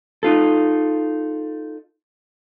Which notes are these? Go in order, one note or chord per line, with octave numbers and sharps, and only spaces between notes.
D#4 F4 A4